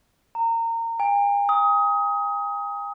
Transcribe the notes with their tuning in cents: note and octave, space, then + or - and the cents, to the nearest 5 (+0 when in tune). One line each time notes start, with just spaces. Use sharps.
A#5 -25
G#5 -45
D#6 +20